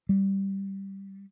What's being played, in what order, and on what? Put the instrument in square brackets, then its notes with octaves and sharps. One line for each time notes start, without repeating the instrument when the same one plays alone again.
[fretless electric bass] G3